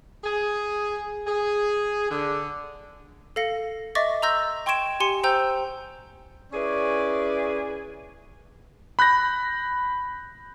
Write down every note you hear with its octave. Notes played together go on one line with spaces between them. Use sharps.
G#4
G#4
D3
A4 F5 A#6 C#7
D#5 E5 C#6 D6 A6 A#6
A#5 C6 E6 G6 A#6
G5 C6 C#6 G#6 D7 E7
G4 G#5 C6 C#7
C5 G5 A#5 E6 G6
C#4 E4 G#4 B4 D5
B5 F#6 G6 A#6